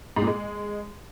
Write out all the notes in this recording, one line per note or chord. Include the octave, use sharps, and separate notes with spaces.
G#2
A#2
G#3